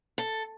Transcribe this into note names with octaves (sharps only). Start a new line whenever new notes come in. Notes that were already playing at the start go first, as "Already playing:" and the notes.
A4